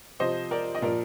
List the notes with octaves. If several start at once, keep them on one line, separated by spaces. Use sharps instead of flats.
C3 F3 C5 D#5
A#4 D5
D#5
A#2 F3 A#4 D5